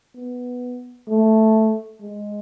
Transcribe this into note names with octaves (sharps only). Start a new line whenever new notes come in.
B3
A3
G#3